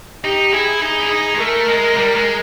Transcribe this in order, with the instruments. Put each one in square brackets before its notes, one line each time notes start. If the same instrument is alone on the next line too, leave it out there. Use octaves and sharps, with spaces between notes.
[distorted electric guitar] D#4 [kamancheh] G4
[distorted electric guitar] E4 [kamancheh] G#4
[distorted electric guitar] D#4 [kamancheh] G#4
[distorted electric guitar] E4
D#4
G#3
[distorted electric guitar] A3 [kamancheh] A#4
[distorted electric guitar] G#3
G3
G#3